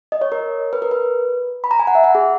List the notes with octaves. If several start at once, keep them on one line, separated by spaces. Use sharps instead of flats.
D#5
C#5
A#4
B4
A#4
B4
B5
A#5
G#5
F#5
E5
F#5
G#4